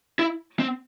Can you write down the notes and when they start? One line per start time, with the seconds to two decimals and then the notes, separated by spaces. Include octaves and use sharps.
0.19 E4
0.60 C4